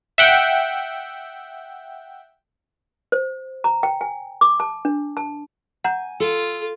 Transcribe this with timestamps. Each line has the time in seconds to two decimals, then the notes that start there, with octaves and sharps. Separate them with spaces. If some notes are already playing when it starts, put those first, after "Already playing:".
0.18 E5 F#5 G5
3.12 C5
3.64 A#5
3.83 G5
4.01 G#5
4.41 D6
4.60 A5
4.85 D4
5.17 A5
5.84 F#5 G#5 A#5 G6
6.20 F4 A4